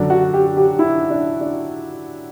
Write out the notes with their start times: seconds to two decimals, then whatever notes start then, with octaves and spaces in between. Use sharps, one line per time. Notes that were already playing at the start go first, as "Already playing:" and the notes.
Already playing: F#2 D3 D4
0.10 F#4
0.34 G4
0.57 G4
0.79 E4
1.10 D4
1.41 D4